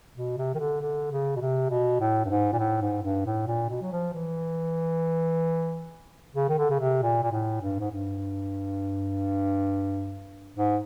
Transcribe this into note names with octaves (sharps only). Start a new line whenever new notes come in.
B2
C3
D#3
D3
D3
C#3
B2
C3
B2
A2
G2
G#2
A#2
A2
G#2
G2
A2
A#2
B2
F#3
F3
E3
C#3
D#3
D3
C#3
C3
A#2
A#2
A2
G2
G#2
G2
G#2